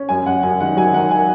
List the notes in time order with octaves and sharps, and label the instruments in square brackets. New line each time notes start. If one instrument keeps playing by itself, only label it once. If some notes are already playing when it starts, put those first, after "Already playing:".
Already playing: [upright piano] C#4
F#2 G#5
F#2 F#5
F#2 G#5
D#3 F#5
F#3 G#5
D#3 F#5
G#5